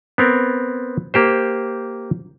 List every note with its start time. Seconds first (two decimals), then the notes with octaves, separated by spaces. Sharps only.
0.18 B3 C4 A#4
1.14 A#3 G4 C5